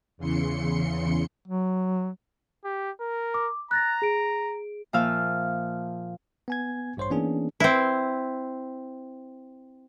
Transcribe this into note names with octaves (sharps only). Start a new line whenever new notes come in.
E2 C#3 E3 C6 C#7
F#3
G4
A#4
D6
A#5 F#6 A6 A#6
G#4 D7
A#2 F3 E5 F5 F6
B3 G#5 G#6
A1 G2 C5 C#5 C6
E3 A#3 B3 C#4 D4 G#4
C4 E4